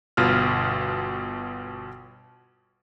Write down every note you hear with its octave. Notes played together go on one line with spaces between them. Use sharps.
G1 B2 F4 F6